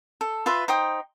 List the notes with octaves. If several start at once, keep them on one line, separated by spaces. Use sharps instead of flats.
A4
F4 B4 E5 C6
D#4 C5 G5 D#6